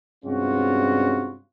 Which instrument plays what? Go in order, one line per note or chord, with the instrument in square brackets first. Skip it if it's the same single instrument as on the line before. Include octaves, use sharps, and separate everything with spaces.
[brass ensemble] G2 C3 G#3 C#4 F4 F#4